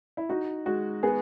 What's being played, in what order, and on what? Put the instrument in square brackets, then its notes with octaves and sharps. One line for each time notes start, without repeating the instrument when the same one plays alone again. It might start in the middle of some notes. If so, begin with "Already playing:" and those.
[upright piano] E4
[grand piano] D#4 [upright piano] F#4
[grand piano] G#3 [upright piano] F#4
[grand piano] B3 [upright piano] G#4